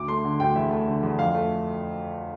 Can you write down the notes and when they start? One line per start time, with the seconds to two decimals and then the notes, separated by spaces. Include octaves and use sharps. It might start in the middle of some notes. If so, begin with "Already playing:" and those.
Already playing: D2 D6
0.08 A3 C6
0.24 D3
0.40 D2 G5
0.56 E2 E5
0.71 A3
0.87 D3
1.03 E2
1.19 F2 F5
1.35 A3